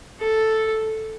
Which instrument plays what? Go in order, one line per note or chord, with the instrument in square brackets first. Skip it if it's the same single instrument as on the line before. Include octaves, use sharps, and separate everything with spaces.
[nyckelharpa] A4